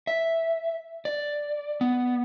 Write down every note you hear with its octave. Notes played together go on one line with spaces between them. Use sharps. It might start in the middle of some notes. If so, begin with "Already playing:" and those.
E5
D5
B3